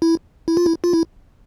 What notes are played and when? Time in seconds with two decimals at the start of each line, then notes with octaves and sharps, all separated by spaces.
0.02 E4
0.48 E4
0.57 F4
0.66 E4
0.84 F4
0.93 E4